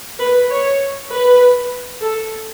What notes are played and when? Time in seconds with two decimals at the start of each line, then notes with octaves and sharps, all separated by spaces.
0.20 B4
0.50 C#5
1.11 B4
2.02 A4